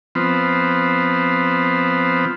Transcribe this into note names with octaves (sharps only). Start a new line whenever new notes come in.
F3 B3 C4